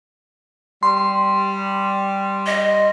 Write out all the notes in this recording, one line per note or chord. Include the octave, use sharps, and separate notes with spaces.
G3 C6
D#5